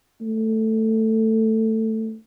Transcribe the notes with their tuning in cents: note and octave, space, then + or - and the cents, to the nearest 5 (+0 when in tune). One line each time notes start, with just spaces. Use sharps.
A3 +10